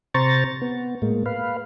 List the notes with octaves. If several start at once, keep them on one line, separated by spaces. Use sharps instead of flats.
C3 C5 A#5 C#6 A6
B3
A2 G#3 A#3
B4 F5